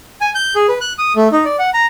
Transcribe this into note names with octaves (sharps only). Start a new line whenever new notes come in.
G#5
G6
G#4
B4
F#6
D#6
A3
D#4
D5
F#5
A#5